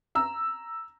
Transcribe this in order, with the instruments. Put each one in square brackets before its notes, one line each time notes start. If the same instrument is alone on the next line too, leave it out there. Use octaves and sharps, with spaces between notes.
[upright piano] A#5 E6